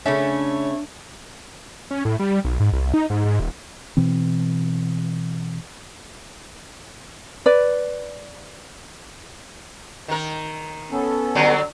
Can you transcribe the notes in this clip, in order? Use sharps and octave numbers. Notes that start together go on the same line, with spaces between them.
C#3 A3 C#4 D4 C#5 E5
C#4
A2
G3
B1
G#2
C2
D#4
G#2
G#2
D#1
B2 E3 C4
B4 D5
D#3 A#4
B3 C#4 A4
D3 F#3 G3